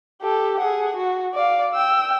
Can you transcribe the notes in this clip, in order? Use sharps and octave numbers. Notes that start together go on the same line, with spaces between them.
G4 A4
G#4 F#5
F#4
D5 F5
G5 E6